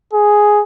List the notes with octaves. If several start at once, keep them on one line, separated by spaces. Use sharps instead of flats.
G#4